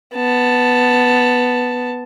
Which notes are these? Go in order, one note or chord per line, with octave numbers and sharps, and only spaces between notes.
B3 A5